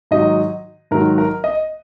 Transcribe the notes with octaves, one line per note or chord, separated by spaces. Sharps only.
G#2 D#3 F#3 D#4 D#5
G#2 D#3 F#3 A#4
A#4
D#5